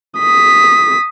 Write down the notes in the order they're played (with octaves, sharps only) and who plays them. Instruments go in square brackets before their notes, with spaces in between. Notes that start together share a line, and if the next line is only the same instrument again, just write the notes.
[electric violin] D#6 B6